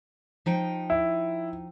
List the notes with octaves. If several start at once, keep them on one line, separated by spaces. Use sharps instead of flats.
F3 D#4 G5
E4